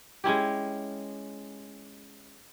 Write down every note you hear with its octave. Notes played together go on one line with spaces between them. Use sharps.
G#3 C#4 E4 G4